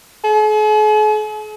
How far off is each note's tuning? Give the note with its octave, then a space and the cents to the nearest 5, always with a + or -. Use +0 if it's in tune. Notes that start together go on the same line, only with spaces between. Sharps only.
G#4 +45